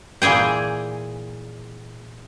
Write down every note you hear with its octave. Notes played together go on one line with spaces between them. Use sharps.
A#2 E3 G#4 G5